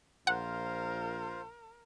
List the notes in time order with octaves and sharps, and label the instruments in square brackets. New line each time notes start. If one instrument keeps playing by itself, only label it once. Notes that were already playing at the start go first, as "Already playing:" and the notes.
[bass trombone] A#1 [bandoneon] F4 C5 F5 [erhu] A#4 [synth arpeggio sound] F#5